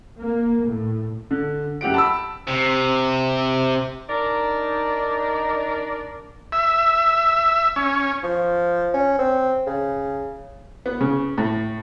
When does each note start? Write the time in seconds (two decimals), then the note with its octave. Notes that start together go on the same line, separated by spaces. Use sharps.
0.19 A#3
0.65 A2
1.31 D3
1.81 F#2 G4 F#5 D7
1.94 A5 B5 E6
2.48 C3
4.09 D4 D#4 A#4 D5
6.52 E5
7.76 C#4
8.23 F3
8.94 C#4
9.19 C4
9.67 C#3
10.86 B3
11.00 C#3
11.38 A2